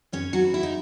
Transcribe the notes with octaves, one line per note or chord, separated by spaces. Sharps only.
F#2 C#4 C#5
F#3 F#4
E3
E4
D#4